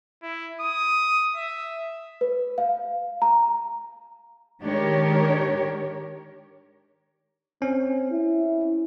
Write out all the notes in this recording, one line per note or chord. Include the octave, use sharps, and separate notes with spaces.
E4
D#6
E5
B4
F5
A#5
D#3 G#3 D4 G4 A#4 C#5
C4 C#4
E4